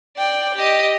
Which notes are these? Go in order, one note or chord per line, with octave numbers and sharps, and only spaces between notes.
D5 G5
G4 D#5